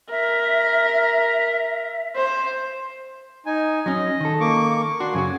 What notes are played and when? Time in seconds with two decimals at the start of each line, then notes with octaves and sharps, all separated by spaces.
0.11 A#4 E5
2.16 C5
3.46 D#4 G#5
3.86 F#3 C#4 D#5
4.20 D#3 A4
4.40 A#3 C#6 D6
5.00 D4 F#4 C6
5.14 F#2 C#3 F#4 G#5